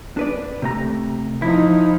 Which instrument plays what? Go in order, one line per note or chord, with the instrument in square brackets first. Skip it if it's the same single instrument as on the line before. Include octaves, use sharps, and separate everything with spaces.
[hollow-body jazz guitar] D4 B4 D5
C3 A3 A#5
[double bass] F3 D#4 [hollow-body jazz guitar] E4